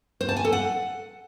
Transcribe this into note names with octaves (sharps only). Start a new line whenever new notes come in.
C5
A5
G#5
A4
F#5